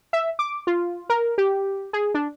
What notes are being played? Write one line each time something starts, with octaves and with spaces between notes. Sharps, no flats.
E5
D6
F4
A#4
G4
G#4
D4